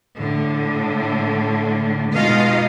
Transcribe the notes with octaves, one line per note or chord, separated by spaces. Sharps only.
A2 D3
B2 G#3 D#4 F4 D#5 F5